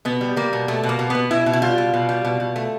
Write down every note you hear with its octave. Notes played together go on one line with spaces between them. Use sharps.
B2 B3
G3
G3 A#3
B2
B2 A3
B2
A#3
B2
B2 B3
B2 E4
B2
E4
G3 F4
B2
B2
G3
B2
B2
A3